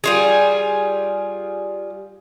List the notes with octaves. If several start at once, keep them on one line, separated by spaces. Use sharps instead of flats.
G3 F4 G#4